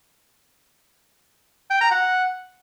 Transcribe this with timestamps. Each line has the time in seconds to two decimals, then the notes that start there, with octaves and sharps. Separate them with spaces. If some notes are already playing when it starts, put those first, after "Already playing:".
1.70 G5
1.81 A#5
1.91 F#5